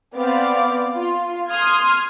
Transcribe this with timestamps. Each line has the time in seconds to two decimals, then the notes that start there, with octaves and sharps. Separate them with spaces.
0.15 B3 C4 D5 F5 D6
0.95 F4
1.50 C6 D#6 F6 G#6